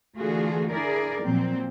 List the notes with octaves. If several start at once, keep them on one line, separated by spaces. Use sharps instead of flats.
D3 E3 A3 F4 F#4 G#4
D4 E4 G#4 A#4 D5
A#2 F3 F#3 C4